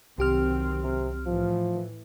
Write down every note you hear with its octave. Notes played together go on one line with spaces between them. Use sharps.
C2 D#3 F#3 C4 G4 F6
C3
A2 E3 F3